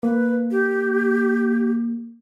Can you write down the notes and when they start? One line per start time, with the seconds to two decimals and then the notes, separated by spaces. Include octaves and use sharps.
0.03 A#3 B4
0.51 G4